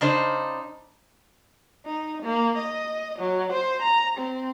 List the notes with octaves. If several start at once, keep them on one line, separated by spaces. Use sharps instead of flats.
C#3 D4 D#4 C5
D#4
A#3
D#5
F#3
C5
A#5
C4